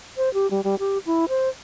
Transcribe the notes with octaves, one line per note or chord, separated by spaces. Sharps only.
C5
G4
G3
G3
G4
E4
C5